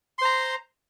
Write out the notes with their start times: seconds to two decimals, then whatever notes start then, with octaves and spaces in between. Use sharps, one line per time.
0.19 C6
0.22 C5
0.25 A#5